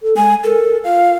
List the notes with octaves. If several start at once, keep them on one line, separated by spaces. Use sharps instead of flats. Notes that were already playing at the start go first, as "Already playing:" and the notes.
A4
G#3 G#5
A4 A#4
F4 F5